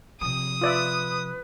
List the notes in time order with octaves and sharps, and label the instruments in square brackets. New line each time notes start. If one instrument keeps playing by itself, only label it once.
[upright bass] C3 F3 [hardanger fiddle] D#6
[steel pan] F4 D5 E5 [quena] B4